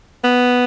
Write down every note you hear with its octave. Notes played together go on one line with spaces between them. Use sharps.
B3